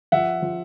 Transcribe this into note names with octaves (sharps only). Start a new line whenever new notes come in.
F3 E5 F#5
F3